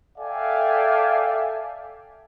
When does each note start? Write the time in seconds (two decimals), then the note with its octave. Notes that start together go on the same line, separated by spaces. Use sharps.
0.18 A4 D5 E5 F5 G5 G#5